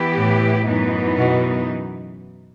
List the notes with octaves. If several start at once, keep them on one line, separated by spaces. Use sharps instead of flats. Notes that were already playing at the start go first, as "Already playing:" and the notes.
Already playing: E3 B3 E4 G4
A2
F#2 E3 B3 D#4
B2